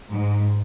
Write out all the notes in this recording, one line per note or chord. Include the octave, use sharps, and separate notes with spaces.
G#2